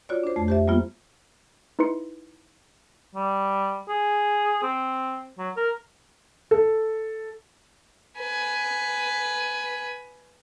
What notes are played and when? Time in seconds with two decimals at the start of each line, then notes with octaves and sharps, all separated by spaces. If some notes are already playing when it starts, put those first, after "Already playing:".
0.09 F4 F#4 C#5 D5
0.23 D4 C5
0.36 F2 A3 A5
0.48 G4 C5 E5
0.68 G3 A#3 B3 F4
1.79 D#4 E4 B4 C6 C#7
3.15 G3
3.89 G#4
4.63 C4
5.38 F#3
5.57 A#4
6.51 A4
8.19 B4 G#5